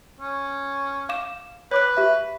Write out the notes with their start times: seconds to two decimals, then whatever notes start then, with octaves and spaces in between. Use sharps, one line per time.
0.20 C#4
1.09 F5 D6 E7
1.71 B4 C#5 D6 F#6
1.97 G4 E5